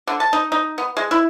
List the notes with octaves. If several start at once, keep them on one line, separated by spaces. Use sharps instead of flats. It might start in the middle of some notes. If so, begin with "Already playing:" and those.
D3
A5
D#4
D#4
B3
G#3
E4